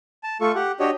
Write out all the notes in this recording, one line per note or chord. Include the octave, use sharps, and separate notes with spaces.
A5
A3 F4 A4 C#6
G4 F#5
D4 F#4 G4 C#5 D#5